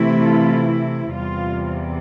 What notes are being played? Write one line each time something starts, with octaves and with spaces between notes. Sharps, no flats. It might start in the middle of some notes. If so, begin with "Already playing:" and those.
Already playing: C3 E3 A3 E4
F4 A4
E2 C3 G3 F4